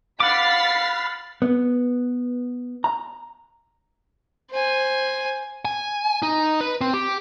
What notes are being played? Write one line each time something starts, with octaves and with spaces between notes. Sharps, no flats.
F5 F#5 B5 D6 F6 A6 B6 C7
B3
A#5
C5 G#5
G#5
D#4
B4
C4
G4